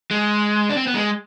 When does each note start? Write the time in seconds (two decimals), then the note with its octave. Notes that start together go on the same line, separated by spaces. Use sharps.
0.11 G#3
0.69 D4
0.77 C4
0.87 B3
0.95 G#3